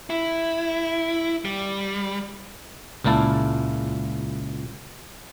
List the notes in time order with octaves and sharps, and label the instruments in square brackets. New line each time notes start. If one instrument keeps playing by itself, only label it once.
[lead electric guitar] E4
G3
[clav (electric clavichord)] C#2 A#2 A#3 E4 A5